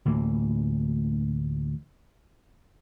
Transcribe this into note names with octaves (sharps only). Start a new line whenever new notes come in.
D2 A2 E3 A#3